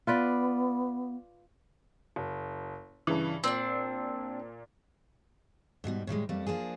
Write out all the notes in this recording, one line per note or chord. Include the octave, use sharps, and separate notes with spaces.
B3 F4 B4 D5
F#1
G2 C#3 E3
A#2 C4 D4
G#2 B2 G3 B3
A2 D#3 G3 G#3
F2 G3 A3 A#3
F3 A#3 D4 G#4